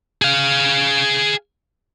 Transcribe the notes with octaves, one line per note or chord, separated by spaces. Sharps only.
G#4 F5